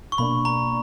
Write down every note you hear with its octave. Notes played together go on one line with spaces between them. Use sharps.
C#6
B2 A#3 D4 B5
A#5